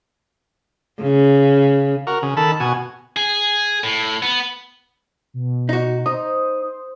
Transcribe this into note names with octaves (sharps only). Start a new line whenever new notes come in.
C#3
F#4 A#4
C#3
D#3 A4 A5 B5
B2 F#4 G#5
G#4
A2
B3
B2
D#4 F#4
D#4 C5 D#6